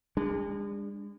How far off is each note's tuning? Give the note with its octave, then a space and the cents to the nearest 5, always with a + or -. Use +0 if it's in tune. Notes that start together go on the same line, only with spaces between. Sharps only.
G#3 -40 D4 +0